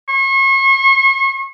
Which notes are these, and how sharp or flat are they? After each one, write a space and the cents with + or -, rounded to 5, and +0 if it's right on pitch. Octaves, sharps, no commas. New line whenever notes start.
C#6 -40